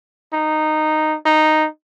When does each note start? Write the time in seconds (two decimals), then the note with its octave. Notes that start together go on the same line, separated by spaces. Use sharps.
0.33 D#4
1.26 D#4